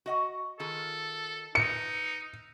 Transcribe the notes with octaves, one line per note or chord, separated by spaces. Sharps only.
F#4 D#5 F#5
D#3 F4 G#4 A4
D#4 B4 C#7